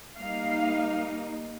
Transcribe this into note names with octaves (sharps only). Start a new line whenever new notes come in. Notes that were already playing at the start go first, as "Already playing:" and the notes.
G3 A#3 D#4 F5